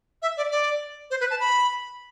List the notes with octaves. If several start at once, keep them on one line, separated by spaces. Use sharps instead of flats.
E5
D5
D5
C5
B4
A5
B5